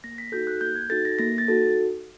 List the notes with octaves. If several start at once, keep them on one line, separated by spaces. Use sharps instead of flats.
A#3 A#6
B6
D#4 F#4 A4 G6
F#6
A#3 G6
G#6
D#4 F#4 A4 A6
A#6
A#3 A#6
A6
D#4 F#4 A4